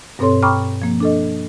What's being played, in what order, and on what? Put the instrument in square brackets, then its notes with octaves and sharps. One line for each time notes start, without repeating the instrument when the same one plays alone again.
[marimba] G2 B2 C4 A4 C#5 C6
G5 A#5 B5 C#6 D6 F6
F3 A#3
D4 A4 D#5